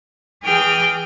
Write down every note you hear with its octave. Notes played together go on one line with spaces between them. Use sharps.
E3 G#4 G5 D6 F6